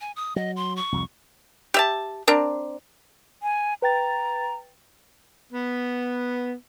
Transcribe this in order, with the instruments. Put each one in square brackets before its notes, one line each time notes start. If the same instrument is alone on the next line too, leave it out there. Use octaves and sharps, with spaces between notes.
[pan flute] G#5
D#6
[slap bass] F#3 [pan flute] D#5
[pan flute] C6
C#6
[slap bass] C2 F2
[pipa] G4 E5 A5
C4 D4 A#4
[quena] G#5
[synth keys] B4 G5 A6 [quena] A#5
[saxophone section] B3